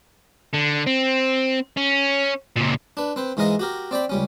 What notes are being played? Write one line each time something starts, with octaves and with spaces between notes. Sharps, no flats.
D3
C4
C#4
C#2 A#2
D4 B4
C4 B4 C5
G#2 E3 G#3 A#4 D#5 F5
F#4 G4 A#4
C4 D5 G5 B5
C#2 G3 C#4